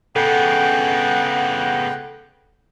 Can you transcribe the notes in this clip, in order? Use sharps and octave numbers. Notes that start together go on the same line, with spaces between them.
C#3 B3 A4 F#5 G5